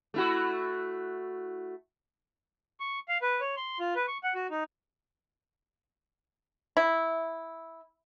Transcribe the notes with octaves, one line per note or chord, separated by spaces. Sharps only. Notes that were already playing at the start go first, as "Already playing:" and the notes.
A3 E4 F#4
C#6
F5
B4
C#5
C6
F4
B4
C#6
F#5
F#4
D#4
E4